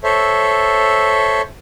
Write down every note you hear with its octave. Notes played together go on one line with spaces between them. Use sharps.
A4 C5 C#5 E5